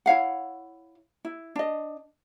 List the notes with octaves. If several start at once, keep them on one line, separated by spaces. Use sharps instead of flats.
E4 C#5 F5 F#5
E4
D4 D#5